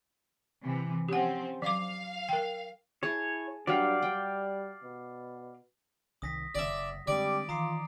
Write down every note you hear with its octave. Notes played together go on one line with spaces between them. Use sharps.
C3 E3
F3 C4 C#4 G4 F#5
F#3 F5 D6
A#4 G5
E4 G#4 C#5 A5
G2 F#3 G4 D5 F5
G3 G5
B2
C2 D#3 D#6 A#6 B6
F#1 D5 E5
D3 G3 G#3 C4 D5 D6 D7
D#3 E3 F4 A#5 D#6 C7